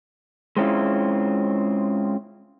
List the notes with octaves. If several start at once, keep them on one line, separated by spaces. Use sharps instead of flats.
G#3 C4 C#4 E4 F4